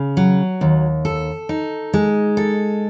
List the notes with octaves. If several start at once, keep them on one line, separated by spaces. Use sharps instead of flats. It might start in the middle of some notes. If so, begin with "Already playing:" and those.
Already playing: C#3
F#3
D#2
A4
D#4
G#3
A4